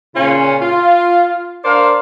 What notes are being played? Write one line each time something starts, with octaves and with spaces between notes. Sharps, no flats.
A#2 C#3 C#4 F4
F4
D4 A#4 C5 D5 F5